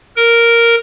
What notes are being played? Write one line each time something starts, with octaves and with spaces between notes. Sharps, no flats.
A#4